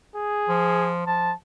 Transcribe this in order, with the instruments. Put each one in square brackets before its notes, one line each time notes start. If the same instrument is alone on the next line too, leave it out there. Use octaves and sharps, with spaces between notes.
[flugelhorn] G#4
[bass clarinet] F3
[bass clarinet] F3 [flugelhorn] A5